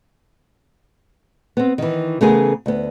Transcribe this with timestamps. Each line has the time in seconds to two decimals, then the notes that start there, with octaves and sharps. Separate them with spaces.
1.57 B3 C4
1.78 D#3 E3
2.21 C#3 E3 A3 B3 G#4 A#4
2.66 D2 B3